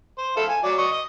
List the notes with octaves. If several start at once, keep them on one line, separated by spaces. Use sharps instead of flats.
C5
E4 A4 F5
G#5
F#3 D5
D#5 C#6
D#5